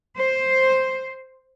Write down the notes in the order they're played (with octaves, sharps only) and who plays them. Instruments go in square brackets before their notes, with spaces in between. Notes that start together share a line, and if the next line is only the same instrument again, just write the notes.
[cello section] C5